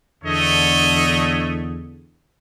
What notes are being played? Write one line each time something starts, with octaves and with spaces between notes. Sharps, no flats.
E2 D3 A3 C#5 D#5